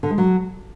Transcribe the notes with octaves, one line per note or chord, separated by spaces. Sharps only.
D3
G#3
F#3